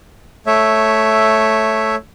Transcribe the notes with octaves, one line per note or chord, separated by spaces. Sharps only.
A3 C#5 E5